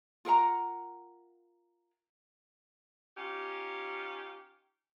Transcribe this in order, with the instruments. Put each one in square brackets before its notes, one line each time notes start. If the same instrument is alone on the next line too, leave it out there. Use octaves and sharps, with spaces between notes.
[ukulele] F4 A#4 F#5 A#5
[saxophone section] C#4 D#4 F4 G4